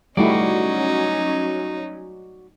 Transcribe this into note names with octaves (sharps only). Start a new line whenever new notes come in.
F#3 G3 A3 C#4 D#4 E4 F#4 D5